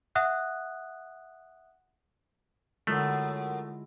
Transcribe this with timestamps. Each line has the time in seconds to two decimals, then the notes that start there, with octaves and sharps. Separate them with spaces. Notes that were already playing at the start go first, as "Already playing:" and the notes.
0.15 E5 F#5 D#6 F#6
2.87 F#2 D3 G#3 A3 E4 F4